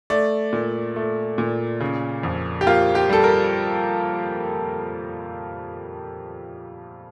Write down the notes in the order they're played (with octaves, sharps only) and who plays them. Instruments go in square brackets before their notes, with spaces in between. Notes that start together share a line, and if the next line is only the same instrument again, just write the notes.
[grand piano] A3 D5
A#2
A3
A#2
C#3
F2
G4
A#3 F4
G4
G3 A4
A#4